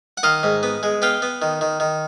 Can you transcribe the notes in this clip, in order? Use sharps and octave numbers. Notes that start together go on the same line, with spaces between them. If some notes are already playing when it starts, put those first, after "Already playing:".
F#5
D#3 D#5 F5
G#2
B3
G#3
B3 F5 G5
B3
D#3
D#3
D#3